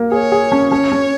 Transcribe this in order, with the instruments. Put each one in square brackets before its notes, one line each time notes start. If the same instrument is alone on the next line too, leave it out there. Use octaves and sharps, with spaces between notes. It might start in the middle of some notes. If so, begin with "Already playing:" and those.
Already playing: [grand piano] A#3
[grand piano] G#4 [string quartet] C#5
[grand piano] G#4
C#4
[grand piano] C#4 [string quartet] C#5
[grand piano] C#4